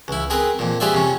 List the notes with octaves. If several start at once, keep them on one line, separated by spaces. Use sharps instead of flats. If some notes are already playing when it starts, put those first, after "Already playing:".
C#2 E4
C4 G#4 A#4 B4
F2 A#2
G4 G#4 B4 C5 D5 E5
F2 C3 C#4